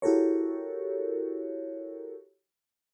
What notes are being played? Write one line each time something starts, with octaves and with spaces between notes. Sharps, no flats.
E4 F#4 G4 A4 A#4 C#5